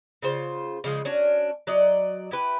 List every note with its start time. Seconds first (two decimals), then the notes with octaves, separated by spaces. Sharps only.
0.22 C#3 F4 C5
0.84 C#3 F3 G3 G#3
1.05 C#4 D4 F#4
1.67 F#3 D5 D#5
2.31 E4 G4 B4